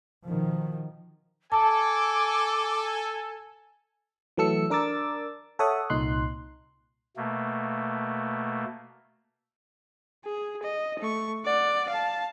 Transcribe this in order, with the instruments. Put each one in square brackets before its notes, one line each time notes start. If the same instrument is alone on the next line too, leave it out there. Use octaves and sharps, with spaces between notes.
[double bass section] B2 D#3 F3
[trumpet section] A4 G#5 [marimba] A5 [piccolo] D6
[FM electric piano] E3 F#3 A3 A4 E6 C#7
D4 A#4 D6 E6 A6
A4 C#5 E5 F#5 D#6
C2 A#2 D#4 C6 F#6
[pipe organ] B2 A3 A#3
[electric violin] G#4
D#5
A3 C#6
D5 F#5
F5 A5